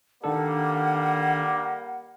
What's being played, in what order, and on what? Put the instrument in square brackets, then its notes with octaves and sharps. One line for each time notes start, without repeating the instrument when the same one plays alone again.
[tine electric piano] D#3 D4 A4 [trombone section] G3 A#3 [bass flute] F#5